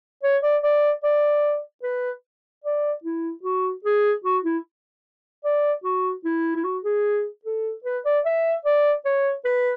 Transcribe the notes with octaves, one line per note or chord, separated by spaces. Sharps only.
C#5
D5
D5
D5
B4
D5
E4
F#4
G#4
F#4
E4
D5
F#4
E4
E4
F#4
G#4
A4
B4
D5
E5
D5
C#5
B4